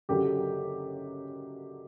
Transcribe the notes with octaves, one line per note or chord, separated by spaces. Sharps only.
F#1 F#2 D3 F#3 G4